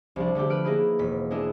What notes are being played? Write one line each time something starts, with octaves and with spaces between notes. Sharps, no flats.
C2 F3 D4
D3 A3 D4 G4
B4 F6 D7
A#3 D#4 E4 G#4 B4
E1 B6
G#3 B3 D4 E4